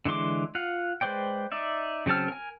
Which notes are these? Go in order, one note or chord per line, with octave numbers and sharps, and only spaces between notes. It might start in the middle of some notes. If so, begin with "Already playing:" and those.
D3 E3 G#3 C6 D6
F4 F5 F#5
G#3 B4 C5 D5 G5
D#4 D5 E5
C#3 F#3 C4 A5 F6
A#4 G#5